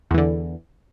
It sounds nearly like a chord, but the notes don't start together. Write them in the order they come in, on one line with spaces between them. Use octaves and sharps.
E2 E3 D3